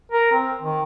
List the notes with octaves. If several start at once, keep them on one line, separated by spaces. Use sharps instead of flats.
A#4
C4
D#3